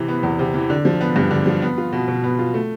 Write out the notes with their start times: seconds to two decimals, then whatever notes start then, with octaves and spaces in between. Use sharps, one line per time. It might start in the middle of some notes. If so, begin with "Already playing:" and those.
Already playing: C3 E3
0.08 B3
0.23 E2
0.39 C3
0.54 E3
0.70 D3
0.85 F3
1.01 B3
1.16 G2
1.31 D3
1.46 F3
1.62 B3
1.78 F4
1.92 B2
2.08 B2
2.24 B3
2.39 F4
2.54 A3